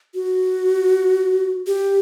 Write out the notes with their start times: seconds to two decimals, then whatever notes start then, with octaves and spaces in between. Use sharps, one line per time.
0.15 F#4
1.67 G4